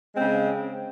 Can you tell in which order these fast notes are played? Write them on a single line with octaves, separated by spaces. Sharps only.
G#3 C4 C#3